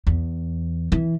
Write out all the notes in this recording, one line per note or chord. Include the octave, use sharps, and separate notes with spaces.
E2
E3